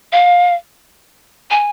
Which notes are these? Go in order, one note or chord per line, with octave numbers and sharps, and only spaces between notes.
F5
G#5